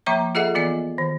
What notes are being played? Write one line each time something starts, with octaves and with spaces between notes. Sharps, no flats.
F3 A#3 E5 A#5 C#6
F4 G#4 A4 D#5 E5 F#5
E3 B3 F4 D5 D#5
D#3